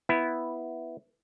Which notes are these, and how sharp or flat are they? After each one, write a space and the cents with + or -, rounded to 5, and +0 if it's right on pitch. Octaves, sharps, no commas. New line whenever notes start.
B3 +5 E4 +0